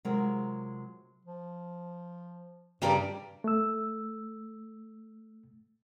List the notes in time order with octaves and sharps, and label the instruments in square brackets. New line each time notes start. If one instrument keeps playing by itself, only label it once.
[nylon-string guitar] C3 F#3 G#3 F4 G#4 A#4
[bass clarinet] F3
[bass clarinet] G2 [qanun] C#3 G3 D5 [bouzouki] F3 G4 A#4
[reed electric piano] A3 E6